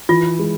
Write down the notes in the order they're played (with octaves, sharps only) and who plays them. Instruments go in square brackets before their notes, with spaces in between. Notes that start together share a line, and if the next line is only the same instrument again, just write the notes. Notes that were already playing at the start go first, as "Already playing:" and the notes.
[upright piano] E3 [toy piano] F4
[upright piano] G#3